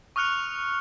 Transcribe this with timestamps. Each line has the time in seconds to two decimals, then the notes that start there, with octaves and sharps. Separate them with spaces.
0.16 C#6 D#6 F6 F#6 C#7 F7